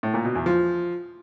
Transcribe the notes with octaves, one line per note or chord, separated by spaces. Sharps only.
A2
A#2
B2
E2
F3